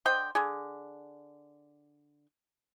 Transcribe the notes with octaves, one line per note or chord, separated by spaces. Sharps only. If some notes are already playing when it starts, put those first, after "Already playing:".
D3 C5 D#5 G5
D3 G#4